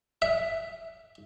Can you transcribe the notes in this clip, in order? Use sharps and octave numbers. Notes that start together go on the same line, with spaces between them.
E5